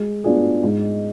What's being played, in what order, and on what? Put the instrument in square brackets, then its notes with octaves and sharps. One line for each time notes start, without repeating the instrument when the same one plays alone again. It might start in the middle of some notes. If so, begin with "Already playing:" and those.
Already playing: [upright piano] G#3
B3 D4 F4 G#4
G#2